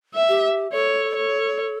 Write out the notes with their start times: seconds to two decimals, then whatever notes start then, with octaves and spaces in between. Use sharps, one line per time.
0.14 E5
0.29 G4
0.72 A4 C#5
1.15 C#5